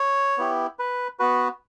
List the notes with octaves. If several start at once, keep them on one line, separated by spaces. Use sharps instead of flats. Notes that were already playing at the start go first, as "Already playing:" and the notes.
Already playing: C#5
B3 E4 G4
B4
B3 F#4 B4